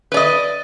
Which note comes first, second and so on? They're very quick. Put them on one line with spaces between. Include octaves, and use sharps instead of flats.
B4 D5 D#5